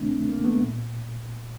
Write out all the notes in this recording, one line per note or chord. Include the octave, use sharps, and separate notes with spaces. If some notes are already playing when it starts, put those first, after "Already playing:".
Already playing: D2 C3 D#3 A3 C4 D4
A3
A#3
A3 B3
C2 A#2